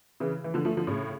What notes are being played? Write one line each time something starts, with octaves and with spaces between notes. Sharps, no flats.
C#3 E3
E3
D3 F3
F3 A3
D3 F3
A2 C#3